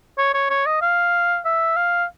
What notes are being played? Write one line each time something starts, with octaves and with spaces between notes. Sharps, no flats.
C#5
C#5
C#5
D#5
F5
E5
F5